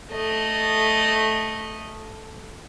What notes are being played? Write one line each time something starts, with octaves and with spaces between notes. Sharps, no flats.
A3 D#5